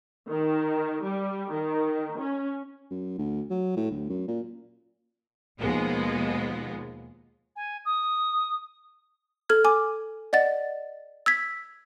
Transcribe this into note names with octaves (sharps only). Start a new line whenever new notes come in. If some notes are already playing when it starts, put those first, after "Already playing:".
D#3
G3
D#3
C#4
F#2
D2
F#3
A2
D2
F#2
A#2
D#2 B2 F3 G#3 B3
G#5
D#6
A4 F6 G#6
G#5 D6
D5 D#5 F#5 A6
E6 G#6 B6